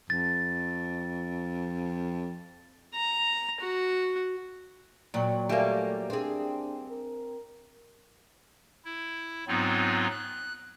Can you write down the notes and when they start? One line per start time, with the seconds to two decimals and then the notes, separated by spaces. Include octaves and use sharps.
0.10 F2 A6
2.94 A#5
3.60 F#4
5.14 A#2 F#3 D5 G5
5.49 G3 A3 A#3 D5 E5 G#5
6.10 C4 D4 G#4
6.88 A#4
8.85 E4
9.48 G#2 F#3 B3 C4 D#4 F4
10.11 F#6